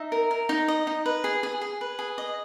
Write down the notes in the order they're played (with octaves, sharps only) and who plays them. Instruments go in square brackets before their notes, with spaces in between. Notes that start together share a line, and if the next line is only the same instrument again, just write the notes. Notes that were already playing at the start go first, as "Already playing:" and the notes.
Already playing: [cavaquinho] D#4 E5
A#4
A#4
D#4
D#5
D#4
B4
G#4
G#4
G#4
B4
G#4
D#5